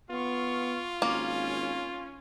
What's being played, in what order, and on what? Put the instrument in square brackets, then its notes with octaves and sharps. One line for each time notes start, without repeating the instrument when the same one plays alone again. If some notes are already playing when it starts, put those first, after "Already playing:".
[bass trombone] B3 [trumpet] F4 [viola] F5 C#6
[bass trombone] G#1 [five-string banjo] A#3 [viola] C#4